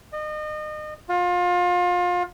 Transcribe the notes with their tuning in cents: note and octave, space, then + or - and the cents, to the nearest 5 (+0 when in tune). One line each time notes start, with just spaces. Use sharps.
D#5 -35
F4 +30